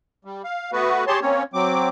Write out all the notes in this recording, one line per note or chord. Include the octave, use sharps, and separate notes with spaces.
G3
F5
A3 B3 F#4 B4
G4 G#4 C#5 A5 C6
A#3 C4 C#4 C#5
F#3 C4 D6